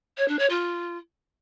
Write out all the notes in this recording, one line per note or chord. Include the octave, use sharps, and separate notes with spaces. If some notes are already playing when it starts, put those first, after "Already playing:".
C#5
D4
C#5
F4